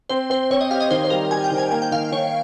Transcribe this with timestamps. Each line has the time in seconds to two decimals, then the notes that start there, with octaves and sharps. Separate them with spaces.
0.09 C4 C5
0.30 C4 C5
0.51 C4 C#5
0.61 D#5
0.71 G4 F5
0.81 D#5
0.91 D#3 C5
1.05 C5
1.10 G3 A#4
1.31 G3 G#5
1.44 G5
1.51 D#3
1.58 G#5
1.71 A#3 G#5
1.82 G5
1.91 D#3 F5
2.12 D#3 C#5